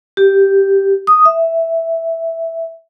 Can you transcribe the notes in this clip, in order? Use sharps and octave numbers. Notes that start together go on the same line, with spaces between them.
G4
D#6
E5